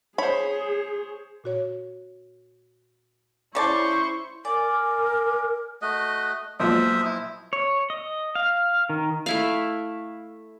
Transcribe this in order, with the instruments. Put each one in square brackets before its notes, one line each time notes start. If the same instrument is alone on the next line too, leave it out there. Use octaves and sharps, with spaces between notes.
[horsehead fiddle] G#4 [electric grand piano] C5 C#5 [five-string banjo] B5
[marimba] A#2 F#4 C#5
[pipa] C#3 D5 A5 [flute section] C#4 C5 C#6 [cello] E4
[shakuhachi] A#4 [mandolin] D5 [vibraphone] G#5 D6
[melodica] A3 F#4 D#5
[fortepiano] B1 A#2 F3 [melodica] C5 E5 D#6
[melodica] E4
[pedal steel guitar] C#5
D#5
F5
D#3
[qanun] A3 E4 F5